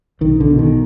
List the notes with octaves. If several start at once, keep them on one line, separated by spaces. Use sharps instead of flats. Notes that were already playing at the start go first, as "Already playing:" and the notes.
B1 D#3
D3
B2
D#3